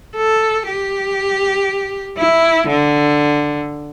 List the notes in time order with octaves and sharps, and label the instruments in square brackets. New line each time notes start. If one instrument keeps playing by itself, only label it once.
[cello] A4
G4
E4
D3